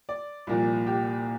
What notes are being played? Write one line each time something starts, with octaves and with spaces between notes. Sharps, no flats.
D5
C2 A#2 F3
G4